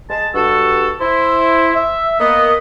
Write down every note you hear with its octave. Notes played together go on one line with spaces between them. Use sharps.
G#3 A5
G2 F#4 A4
E4 C5
E5
A#3 B3 D#5